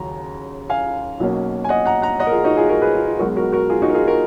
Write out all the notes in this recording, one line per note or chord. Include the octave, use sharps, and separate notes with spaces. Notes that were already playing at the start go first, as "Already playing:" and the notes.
Already playing: D#2 C#3 F#3 C#4 A#5
F5 G#5
B1 B2 A#3 C#4
G#5
D#5 F#5
F#5 A#5
F#5 A#5
D#5 F#5
A#4
F4 G#4
D#4 F#4
F4 G#4
F#4 A#4
G#4 B4
F4
F4
B1 B2 G#3 B3 F#4 A#4
F#4 A#4
F#4 A#4
F4 G#4
D#4 F#4
A#4
F4 G#4
F#4 A#4